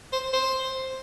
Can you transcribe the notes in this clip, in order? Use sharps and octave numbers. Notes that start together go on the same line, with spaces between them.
C5
C5